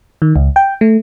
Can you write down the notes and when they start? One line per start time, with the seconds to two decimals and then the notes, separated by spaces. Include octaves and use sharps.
0.22 D#3
0.36 C#2
0.56 G5
0.81 A3